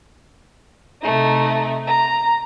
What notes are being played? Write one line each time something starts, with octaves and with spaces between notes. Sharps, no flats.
C3 A3 D#4
A#5